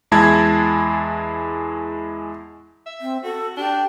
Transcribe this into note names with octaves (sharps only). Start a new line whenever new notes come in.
E2 G#3 E4 A5 G#6
E5
C4
F#4 A4
D4 G4